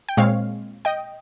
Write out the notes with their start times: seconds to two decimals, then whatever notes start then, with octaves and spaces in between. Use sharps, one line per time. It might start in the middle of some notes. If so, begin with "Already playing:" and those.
0.09 G5
0.17 A#2 G#3 C4 C#5 F5
0.85 D#5 G5